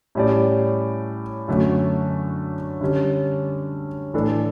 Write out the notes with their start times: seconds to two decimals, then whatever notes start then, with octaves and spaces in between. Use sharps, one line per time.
0.15 A2 G3 C#4 G4 D5
1.48 F#2 D3 A3 C#4 F#4
2.81 D3 G3 C#4
4.14 A2 E3 A3 D4 A4